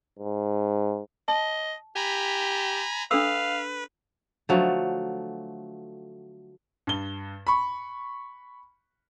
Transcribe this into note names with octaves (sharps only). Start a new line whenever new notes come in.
G#2
D#5 A5
G4 G#5 A#5 B5
D4 A4 B4 F5 E6
D3 F3 F#3 A3
G2 G7
B5 C#6